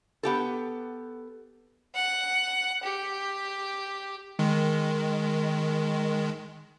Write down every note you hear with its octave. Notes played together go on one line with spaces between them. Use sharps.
B3 G4 A4
F#5
G4
D#3 G#3